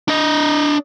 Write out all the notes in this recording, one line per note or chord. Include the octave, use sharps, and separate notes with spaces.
D4 D#5